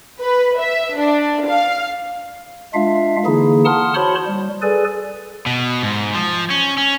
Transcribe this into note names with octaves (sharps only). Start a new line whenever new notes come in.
B4
E5
D4
F5
G#3 D4 F4 E5 F5
D3 E3 A#3 D#4 E4 G#4
F#5 A5 C6 D#6 F6
F#4 C5 C#5 A5 B5 C6
G3
G#4 A4 B4 D5 G#5
B2
G#2
F3
C#4
C#4